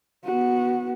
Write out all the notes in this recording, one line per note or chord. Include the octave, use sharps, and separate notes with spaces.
B3 F#4